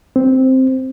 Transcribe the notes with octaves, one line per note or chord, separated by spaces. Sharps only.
C4